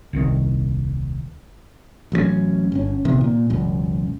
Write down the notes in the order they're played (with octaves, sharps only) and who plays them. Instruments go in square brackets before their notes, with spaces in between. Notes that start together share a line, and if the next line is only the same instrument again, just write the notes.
[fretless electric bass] D#1 C2 D#3
[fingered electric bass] A1 F#3 G#3 C#4
G1 C#4
A#1 C3 D#3 B3
A#2
E1 C#2 F#2